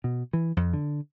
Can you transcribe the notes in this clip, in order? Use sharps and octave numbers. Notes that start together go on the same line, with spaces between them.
B2
E3
F2
D3